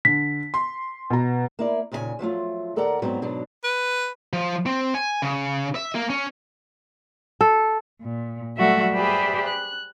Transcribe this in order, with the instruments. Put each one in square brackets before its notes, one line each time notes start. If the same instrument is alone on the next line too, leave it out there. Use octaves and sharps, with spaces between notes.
[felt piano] D3 [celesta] B6
[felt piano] C6
B2 B3 A#5
[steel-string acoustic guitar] A#3 E4 D5
D#2 A#2 C#3 F#4 G#5
F3 F#3 A3 F4
D#2 A4 A#4 D5 F#5 A#5
G#2 F#3 B3 C4 F#4
G#2 B2 F#3 D4
[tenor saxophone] B4
[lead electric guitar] F3
C4
G#5
C#3
E5
A#3
C#4
[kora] A4
[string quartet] A#2
F#3 G3 A3 F#4 E5
G4 G#4 B4 C5 D5 E5
F#6